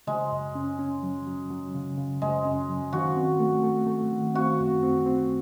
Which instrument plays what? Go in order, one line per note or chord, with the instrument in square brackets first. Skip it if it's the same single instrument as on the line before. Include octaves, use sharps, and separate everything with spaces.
[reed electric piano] C#3 [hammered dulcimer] G#3
[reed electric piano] F#2
C#4
C#4
F#3
F#3
F#3
C#3
C#3
[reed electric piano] F#2 [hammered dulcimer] G#3
[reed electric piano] C#4
F#3
[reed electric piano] D#3 [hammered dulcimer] F#4
[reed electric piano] C4
A3
A3
A3
D#3
[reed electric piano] C4 [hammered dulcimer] F#4
[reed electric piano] F#2
C4
C4